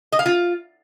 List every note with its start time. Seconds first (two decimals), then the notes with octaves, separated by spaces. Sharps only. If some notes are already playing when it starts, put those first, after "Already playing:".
0.12 D#5
0.19 F5
0.26 F4